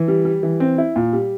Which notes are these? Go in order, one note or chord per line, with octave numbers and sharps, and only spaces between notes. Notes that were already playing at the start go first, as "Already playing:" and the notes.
Already playing: E3
G3
G3
E3
C4
E4
A#2
G3